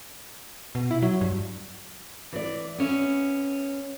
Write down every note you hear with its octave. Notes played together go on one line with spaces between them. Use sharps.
B2
E4
F#3
G2
E3 D5
B3 C#4 E5